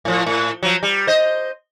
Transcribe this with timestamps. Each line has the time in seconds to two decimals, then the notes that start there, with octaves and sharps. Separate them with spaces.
0.05 A2 F3
0.26 A2
0.63 F3 F#3
0.83 G3
1.07 C5 D#5